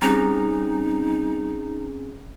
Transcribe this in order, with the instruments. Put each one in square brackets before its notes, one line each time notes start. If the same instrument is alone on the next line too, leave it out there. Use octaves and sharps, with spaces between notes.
[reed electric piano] G3 A#5 [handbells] C4 C#4 G#4 [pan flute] D#4